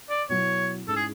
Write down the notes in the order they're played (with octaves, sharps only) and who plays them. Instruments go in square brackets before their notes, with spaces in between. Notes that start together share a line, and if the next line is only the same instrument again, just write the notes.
[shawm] D5
[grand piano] B2 F#3 B3 E4 [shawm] C#5
[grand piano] G#2 G#3 C#4 E4 [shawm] A4
[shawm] G#4